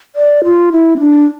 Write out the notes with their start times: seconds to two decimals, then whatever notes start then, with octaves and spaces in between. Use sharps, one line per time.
0.16 D5
0.44 F4
0.72 E4
0.96 C4
1.00 D4